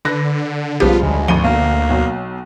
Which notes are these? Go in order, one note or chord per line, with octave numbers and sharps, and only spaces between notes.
D3 B4 F#6 A#6
B1 C#3 F3 G3 B3 F4 G4
D2 G#3
G#1 F3 D#7 G7
B1 A#3
B1 F#3